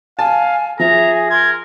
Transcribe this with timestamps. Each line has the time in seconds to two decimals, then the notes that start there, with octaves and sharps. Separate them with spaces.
0.19 F5 G#5 A5
0.79 F3 G#4 E5 A#5
1.30 A#4 C6 G#6